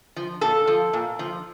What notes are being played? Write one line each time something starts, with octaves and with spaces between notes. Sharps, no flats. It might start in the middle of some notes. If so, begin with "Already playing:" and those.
F3
A#2 A4
F3
A#2
F3